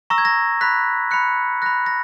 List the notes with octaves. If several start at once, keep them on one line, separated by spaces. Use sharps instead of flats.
A#5 C#6 E6 A#6
G#6
A#6
B5 F#6 B6
B5 F#6 C#7
B5 F#6 A#6
A#6